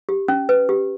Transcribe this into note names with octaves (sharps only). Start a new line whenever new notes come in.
G4
C#4
B4
G4